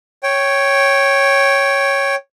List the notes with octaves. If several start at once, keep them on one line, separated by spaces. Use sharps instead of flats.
C#5 G5